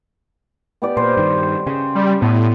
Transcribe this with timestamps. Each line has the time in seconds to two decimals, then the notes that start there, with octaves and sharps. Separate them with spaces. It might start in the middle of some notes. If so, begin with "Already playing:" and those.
0.82 B3 G4 D5
0.97 A#2 C5
1.17 G2 D#3
1.67 C#3 G5
1.95 G3
2.22 A2 B3